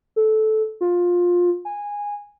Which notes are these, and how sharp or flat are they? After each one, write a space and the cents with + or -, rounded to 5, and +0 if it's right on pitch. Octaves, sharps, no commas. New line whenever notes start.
A4 -15
F4 +15
G#5 -15